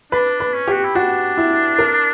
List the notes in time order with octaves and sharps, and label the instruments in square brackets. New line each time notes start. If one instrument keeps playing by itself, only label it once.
[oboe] D4 [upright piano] B4
[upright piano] B4
[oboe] C#4
[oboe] F#4 [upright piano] G4
[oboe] E4
[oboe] D4 [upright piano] F#4
[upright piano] E4
A#4